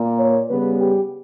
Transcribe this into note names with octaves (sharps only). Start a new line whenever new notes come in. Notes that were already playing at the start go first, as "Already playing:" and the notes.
Already playing: A#2 A#3
C#5
C#3 G3 B3 B4
G4